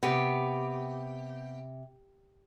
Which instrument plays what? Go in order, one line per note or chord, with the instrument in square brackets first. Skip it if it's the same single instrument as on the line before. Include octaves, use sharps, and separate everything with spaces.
[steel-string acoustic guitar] C3 [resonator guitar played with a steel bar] B3 G4